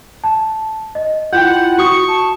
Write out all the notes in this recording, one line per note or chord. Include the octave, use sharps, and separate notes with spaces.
A5
D#5
E4 F4 F#5 G5 G6
F#4 C#6 D#6
A5